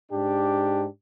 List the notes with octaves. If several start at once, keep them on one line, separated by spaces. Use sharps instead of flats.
G#2 D4 G4